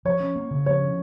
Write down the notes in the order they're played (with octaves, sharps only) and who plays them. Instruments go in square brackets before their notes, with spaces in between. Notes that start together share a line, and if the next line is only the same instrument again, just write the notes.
[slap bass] F3 [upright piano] C#5
[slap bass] C#4
A#3
C#3
[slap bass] F3 [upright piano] C#5
[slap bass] C#4